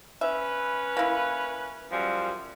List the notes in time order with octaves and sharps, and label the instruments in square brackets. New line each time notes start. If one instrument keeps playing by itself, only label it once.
[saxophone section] C#4 B4 [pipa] E5
[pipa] A#3 E4
[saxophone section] F#2 F3 G3